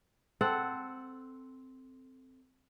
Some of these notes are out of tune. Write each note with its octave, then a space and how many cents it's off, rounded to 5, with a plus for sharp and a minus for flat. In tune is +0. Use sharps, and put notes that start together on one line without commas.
C4 -5 A4 +0 F#5 +0